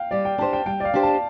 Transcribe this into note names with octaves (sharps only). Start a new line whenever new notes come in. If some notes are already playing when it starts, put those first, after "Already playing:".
Already playing: F5 G5
G3 D5
G5
D4 G4 C5 A5
G5
G3 G5
D5
F5
D4 G4 C5
A5